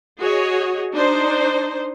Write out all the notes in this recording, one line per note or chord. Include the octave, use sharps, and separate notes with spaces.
F#4 G#4 C#5 D#5
D4 D#4 C5